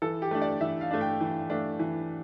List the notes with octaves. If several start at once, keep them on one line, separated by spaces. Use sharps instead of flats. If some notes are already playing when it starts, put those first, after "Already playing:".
E3 A4
G4
A3 D4
D5
E3 E5
F5
A3 D4
G5
E3
A3 D4
E3